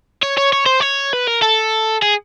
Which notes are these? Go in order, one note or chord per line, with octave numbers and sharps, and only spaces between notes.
C#5
C#5
C#5
C5
C#5
B4
A#4
A4
G#4